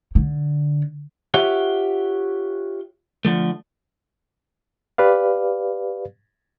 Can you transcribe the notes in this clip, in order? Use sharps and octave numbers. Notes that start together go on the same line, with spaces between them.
D3
F4 G4 C#5 E5 F#5
D3 F3 A3
G4 B4 D5 F5